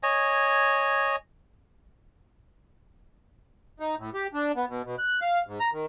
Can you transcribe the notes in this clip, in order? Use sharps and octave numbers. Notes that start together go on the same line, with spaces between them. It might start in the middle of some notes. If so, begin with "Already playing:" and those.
C#5 D#5 G#5
D#4
A2
G4
D4
B3
B2
B2
F#6
F5
G#2
A#5
D#3